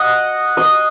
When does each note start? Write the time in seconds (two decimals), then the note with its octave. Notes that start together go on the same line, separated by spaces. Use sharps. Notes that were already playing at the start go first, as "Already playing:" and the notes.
Already playing: D#5 F#5
0.57 D#5